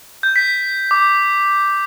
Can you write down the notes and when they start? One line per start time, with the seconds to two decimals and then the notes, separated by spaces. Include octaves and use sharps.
0.23 G6
0.36 B6
0.91 D6